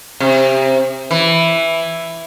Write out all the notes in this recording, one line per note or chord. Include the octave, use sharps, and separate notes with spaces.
C3
E3